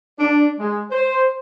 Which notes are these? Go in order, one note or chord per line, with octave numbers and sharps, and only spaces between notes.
D4
G#3
C5